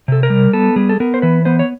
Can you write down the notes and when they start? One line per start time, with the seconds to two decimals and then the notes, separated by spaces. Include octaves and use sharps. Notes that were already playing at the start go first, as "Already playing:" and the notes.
0.08 C3 A4
0.23 A#4
0.30 G3
0.53 B3 A4
0.76 G3 G#4
0.89 A4
1.00 B3 A#4
1.14 C5
1.22 E3 B4
1.45 B3 C5
1.59 C#5